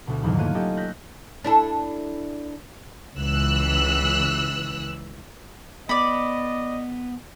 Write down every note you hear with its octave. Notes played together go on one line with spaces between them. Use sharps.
D2 B2
A#1 E2 G#2 D3 D#3 F#3
A3 A#3 F4 C#5 F#6 D#7
C#4 F4 G4 A4 D#5
E6 F#6 G6 A#6 B6
D4 E4 A4
C#2 E3 E6 F#6
B3 D5 D#5 B5